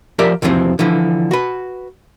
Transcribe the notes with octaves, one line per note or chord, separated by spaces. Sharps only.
F3 G4 A#4 D5 E5
B1 E2 C3 E3 F3 C4
D3 E3 F3
F#4 B4